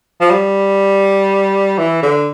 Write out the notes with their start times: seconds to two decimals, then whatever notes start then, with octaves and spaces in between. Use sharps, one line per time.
0.21 F3
0.30 G3
1.78 E3
2.02 D3